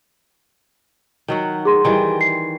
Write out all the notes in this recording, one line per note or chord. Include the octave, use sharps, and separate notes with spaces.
D#3 F#3 F#4
G#4 C6
D#3 E3 G3
C7